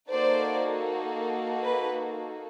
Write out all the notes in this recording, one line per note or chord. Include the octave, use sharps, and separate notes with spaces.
A#3 D#4 F#4 A4 C5 D5
B4